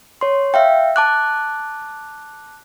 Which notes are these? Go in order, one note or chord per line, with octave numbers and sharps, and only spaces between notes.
C#5 C6
E5 F5 G5
A5 D6 F#6